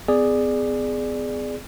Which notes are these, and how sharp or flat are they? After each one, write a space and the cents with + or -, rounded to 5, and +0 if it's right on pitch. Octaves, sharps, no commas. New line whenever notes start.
B3 +40 G#4 +0 D5 +10